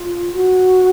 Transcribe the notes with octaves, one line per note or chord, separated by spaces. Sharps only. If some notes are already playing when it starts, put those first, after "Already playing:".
Already playing: F4
F#4